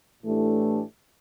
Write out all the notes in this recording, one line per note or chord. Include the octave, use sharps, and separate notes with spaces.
A2 E3 A3 D4 G4